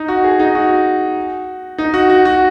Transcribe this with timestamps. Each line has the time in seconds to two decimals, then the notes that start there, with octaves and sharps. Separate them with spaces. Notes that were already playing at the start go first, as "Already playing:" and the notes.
Already playing: D#4
0.08 F#4
0.24 G#4
0.40 D#4
0.55 F#4
1.78 D#4
1.94 F#4
2.10 F#4
2.25 F#4